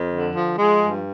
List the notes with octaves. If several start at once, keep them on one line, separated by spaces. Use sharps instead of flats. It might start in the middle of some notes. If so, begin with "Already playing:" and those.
Already playing: F2
D3
F3
F3 G#3
G2